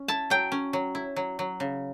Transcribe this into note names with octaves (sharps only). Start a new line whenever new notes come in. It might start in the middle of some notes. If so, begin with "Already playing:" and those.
Already playing: C#4
E4 A5
F#3 G5
C#4
F#3
E4
F#3
F#3
C#3